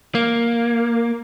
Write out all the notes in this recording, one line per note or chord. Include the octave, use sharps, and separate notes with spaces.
A#3